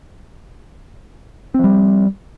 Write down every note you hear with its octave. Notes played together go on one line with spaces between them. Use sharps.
F3 G3 C4